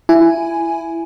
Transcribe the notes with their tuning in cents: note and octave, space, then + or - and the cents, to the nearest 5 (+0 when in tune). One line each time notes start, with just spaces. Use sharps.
E4 +15 G#5 +0